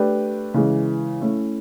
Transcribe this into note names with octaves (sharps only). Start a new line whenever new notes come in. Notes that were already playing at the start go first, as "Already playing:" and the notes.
Already playing: A3 D4 G4 B4
C#3 E3 G#3
A3 C#4 E4